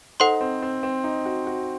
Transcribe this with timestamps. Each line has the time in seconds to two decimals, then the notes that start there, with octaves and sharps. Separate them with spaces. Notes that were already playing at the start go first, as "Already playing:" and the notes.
0.20 D#4 A4 C5 F#5 C6
0.41 C4
0.62 C4
0.83 C4
1.04 D#4
1.26 F#4
1.47 F#4